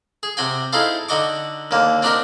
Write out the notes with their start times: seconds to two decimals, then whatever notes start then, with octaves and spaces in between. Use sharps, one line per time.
0.23 G#4
0.37 C3 F#4 G5 G#5
0.73 D#4 E4 G#4 A4 C5 F5
1.09 D3 D#4 F#4 D#5 C#6 D6
1.71 D#2 D3 A#3
2.02 C4 D4 D#4 F#4 G4 A#4